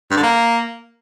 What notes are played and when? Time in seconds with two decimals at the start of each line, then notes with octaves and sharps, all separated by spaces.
0.11 G2
0.17 D3
0.23 A#3